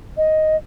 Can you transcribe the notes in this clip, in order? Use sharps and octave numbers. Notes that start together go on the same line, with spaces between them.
D#5